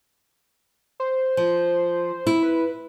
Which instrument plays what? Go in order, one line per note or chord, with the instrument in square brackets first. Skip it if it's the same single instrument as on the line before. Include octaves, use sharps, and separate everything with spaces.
[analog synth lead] C5
[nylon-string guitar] F3
E4
[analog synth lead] B4